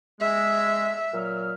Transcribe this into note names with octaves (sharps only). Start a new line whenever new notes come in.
G#3 E5
A#2 F#3 F6